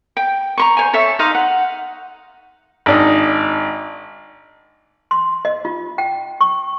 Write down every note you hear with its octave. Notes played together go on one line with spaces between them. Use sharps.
G5
A#5 C6 C#6
C5 C#5 G#5
A4 C#5 E5 C#6
D#4 D#5 F5 C6
F#5
G#1 D4 D#4
C6
D#5
F4
G5
C#6